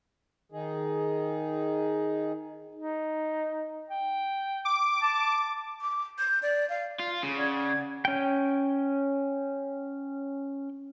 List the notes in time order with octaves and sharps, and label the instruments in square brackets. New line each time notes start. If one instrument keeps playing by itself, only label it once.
[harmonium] D#3 D#4 G#4
[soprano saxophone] D#4
G5
[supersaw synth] D6
[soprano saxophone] A5
[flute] D6
G6
D5
F5
[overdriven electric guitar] F4
C#3
[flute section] D5 F#5 G#6
[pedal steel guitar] C#4 G5